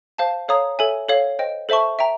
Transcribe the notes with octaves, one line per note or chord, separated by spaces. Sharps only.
C5 F5 A5
A4 C#5 F5 A#5 D#6
A4 C#5 E5 G#5
A4 C#5 F5
C5 D#5 G5
A4 C5 E5 A5 C#6
E5 G5 A#5